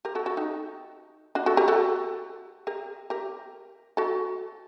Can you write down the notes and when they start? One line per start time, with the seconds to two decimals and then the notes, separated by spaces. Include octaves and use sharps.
0.05 G4 A#4
0.15 F#4 A4
0.26 F#4 A4
0.37 D#4 G4
1.35 D4 F#4
1.46 F#4 A4
1.57 G4 A#4
1.68 F#4 A4
2.67 G4 A#4
3.10 G4 A#4
3.97 F#4 A4